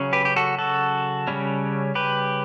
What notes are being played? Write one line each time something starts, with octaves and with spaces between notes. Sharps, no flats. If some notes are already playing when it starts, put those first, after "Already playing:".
Already playing: C#3 F#3 C#4
G4 B4
G4
F#4 A4
F#4 A4
C#3 G3 C#4
G4 B4